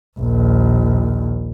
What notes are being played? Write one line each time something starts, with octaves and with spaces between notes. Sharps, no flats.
A#1 D#2